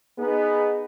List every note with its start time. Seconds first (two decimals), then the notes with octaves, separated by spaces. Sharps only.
0.18 B3 D#4 G#4